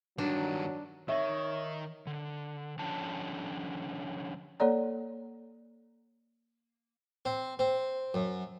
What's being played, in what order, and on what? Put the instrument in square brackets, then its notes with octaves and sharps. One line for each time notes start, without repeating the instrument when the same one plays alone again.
[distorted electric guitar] G2 D#3 [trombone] F#3 [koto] D4
[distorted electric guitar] D#3 [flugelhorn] C#5 [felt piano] E5
[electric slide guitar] D3
D3 F3 C#4 D4 A5
[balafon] A#3 A4 C#5 D5 A#5
[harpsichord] C4
C4
F#2